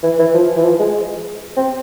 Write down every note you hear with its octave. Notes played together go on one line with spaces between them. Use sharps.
E3
E3
F3
E3
F3
G#3
C4